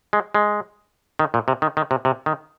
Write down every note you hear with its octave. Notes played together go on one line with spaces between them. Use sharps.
G#3
G#3
D#3
A#2
C3
D#3
D#3
C3
C3
D#3